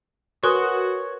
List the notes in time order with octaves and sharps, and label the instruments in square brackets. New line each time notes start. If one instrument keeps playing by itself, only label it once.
[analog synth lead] F#4 [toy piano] A#4 G#5 D#6 [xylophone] B4 C6 F#6 [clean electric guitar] C#5